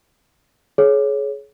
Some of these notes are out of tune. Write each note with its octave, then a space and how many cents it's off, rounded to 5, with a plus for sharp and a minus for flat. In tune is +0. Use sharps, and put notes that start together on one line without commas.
G#4 +30 C#5 +0